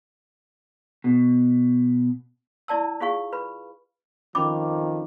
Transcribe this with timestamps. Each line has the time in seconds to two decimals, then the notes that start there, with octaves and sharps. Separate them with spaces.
1.04 B2
2.68 E4 D5 A5 E6
3.00 F4 G#4 F5 C#6
3.33 B4 B5
4.35 F2 D#3 F3 C#4 B5 D6